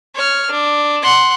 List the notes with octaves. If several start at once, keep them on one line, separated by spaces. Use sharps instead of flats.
C#5 F6
D4
F#5 C6